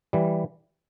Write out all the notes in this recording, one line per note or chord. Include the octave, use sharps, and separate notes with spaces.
E3 G3